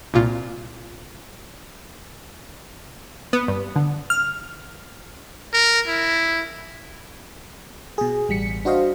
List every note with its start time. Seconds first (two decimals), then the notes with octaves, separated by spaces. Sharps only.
0.14 C2 A#2 F4
3.33 B3
3.48 G2
3.76 D3
4.10 F6
5.54 A#4
5.87 E4
7.98 B2 G#4
8.29 A1 G3 B6 C#7
8.65 D4 F#4 C5 D#5 F5